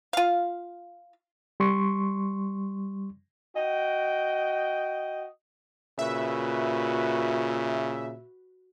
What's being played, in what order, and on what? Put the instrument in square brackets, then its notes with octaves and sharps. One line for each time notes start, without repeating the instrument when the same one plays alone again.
[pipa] F4 F5
[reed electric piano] G3 C6 C#6
[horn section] F#4 D#5 G5
[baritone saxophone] A#2 [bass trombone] C#3 [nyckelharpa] F#4 B4 [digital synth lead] E5